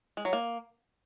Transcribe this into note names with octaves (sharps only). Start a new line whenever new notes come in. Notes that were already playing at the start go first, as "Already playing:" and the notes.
G#3
F#3
A#3